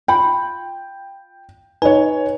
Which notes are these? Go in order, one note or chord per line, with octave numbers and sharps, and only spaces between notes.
F4 G5 B5
D#4 B4 C#5 G#5